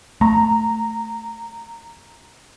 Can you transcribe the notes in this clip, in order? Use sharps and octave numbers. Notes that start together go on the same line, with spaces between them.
A3 A#5